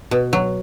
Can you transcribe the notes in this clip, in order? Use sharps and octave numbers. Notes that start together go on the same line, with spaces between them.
B2
F#3